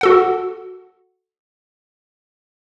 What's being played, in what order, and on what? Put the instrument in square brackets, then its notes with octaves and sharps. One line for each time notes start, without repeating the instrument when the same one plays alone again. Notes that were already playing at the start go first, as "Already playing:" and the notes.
[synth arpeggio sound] F#4 A4 F#5